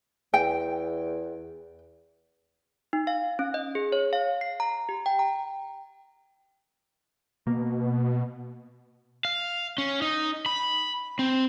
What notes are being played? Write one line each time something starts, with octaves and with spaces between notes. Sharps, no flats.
E2 G5
D#4
F5
C#4
D#5
G#4
C#5
F5
C7
A#5
G4
G5
A#5
B2 A#3
F5
C#4
D#4
B5
C4